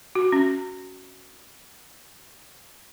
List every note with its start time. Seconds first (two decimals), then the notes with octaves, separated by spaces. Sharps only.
0.15 F#4
0.32 C#4